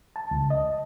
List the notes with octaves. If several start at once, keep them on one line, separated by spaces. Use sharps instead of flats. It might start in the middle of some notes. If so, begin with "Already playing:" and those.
A5
C#2
D#5